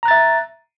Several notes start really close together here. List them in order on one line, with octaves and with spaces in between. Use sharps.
A#5 F#6 A6 E5